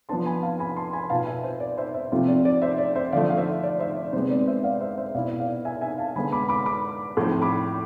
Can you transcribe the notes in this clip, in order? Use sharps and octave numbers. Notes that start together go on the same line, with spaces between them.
F3 B3 D4 A5 C6
G#5 B5
F5 A5
G#5 B5
A5 C6
G#5 B5
B2 B3 F4 F5 A5
E5 G#5
C5
D5
C5 E5
C5 E5
C3 F3 A3 C4 F4 C5
D5
D5
C5 E5
D5
C5 E5
D3 F3 A3 D5 F5
F5
C5 E5
D5
C5 E5
D5
C3 G#3 B3 C5
D5
C5 E5
D5 F5
C5 E5
C5 E5
B2 B3 E4 D5 F5
D5 F5
E5 G#5
E5 G#5
F5 A5
D3 G#3 B3 G#5 B5
B5 D6
B5 D6
B5 D6
A2 F3 A3 C4
B5 D6